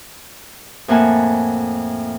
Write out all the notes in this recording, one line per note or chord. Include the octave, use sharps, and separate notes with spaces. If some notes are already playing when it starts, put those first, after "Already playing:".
F2 A2 A#3 F#5 G#5 A5